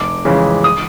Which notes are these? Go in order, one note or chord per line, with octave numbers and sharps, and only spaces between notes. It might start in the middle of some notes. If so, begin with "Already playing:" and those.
Already playing: F1 D6
F2 C#3 E3 G#3
D#6